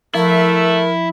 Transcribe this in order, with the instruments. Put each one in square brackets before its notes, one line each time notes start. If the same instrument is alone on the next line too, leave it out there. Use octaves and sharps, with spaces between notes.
[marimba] F3 [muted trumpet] A3 [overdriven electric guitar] E4 [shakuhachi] A#4